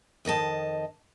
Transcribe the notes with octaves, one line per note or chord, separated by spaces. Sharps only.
F2 D#3 D#5 A5